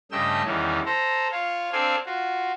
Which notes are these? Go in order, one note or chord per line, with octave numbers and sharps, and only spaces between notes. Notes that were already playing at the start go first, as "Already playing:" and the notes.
G2 C#3 A3 D#5 G5 E6
E2 D#3 E3 G3 C#4
A4 C5 A#5
F4 C#5 F5
C4 D4 A4 C5 F5 G#5
F4 F#4